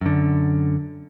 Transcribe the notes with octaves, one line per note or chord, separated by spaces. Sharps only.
F#2 D3